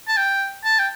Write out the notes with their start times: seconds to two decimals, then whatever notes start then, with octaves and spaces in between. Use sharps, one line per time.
0.08 A5
0.17 G5
0.64 A5
0.79 G5